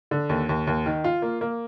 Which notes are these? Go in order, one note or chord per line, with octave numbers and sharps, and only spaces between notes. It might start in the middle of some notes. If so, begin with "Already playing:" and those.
D3
D#2
D#2
D#2
D#3
F4
A#3
A#3